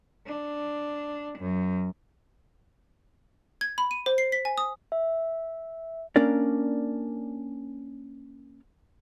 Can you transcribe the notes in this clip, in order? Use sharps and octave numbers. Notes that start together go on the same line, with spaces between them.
D4
F#2
G#6
B5
D#7
C5
C7
B6
G#5
D#6
E5
A#3 C#4 D4 A#4 D5